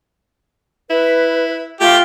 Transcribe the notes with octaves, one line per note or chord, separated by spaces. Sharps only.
E4 B4
A3 F4 G4